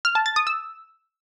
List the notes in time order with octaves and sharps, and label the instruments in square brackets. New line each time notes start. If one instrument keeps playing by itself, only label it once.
[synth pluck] F6
A5
A6
D#6
E6